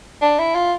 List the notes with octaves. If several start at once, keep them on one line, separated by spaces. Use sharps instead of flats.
D4
E4
F4